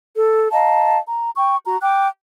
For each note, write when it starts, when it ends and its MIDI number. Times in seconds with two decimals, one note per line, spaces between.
0.17 0.49 69
0.52 0.98 75
0.52 0.98 77
0.52 0.98 81
0.52 0.98 82
1.06 1.31 82
1.37 1.57 79
1.37 1.57 85
1.67 1.78 66
1.67 1.78 82
1.82 2.07 79
1.82 2.07 86
1.82 2.07 90